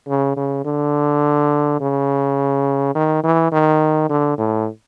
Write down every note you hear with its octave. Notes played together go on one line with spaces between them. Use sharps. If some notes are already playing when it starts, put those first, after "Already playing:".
C#3
C#3
D3
C#3
D#3
E3
D#3
D3
A2